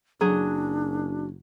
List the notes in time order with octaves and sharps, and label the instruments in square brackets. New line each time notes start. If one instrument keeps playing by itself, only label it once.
[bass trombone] F#1 [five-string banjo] F#3 [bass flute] D4 [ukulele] G#4